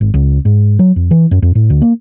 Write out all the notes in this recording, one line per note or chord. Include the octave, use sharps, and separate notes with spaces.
G#1
C#2
G#2
F#3
F2
E3
F#2
F2
A2
D2
A#3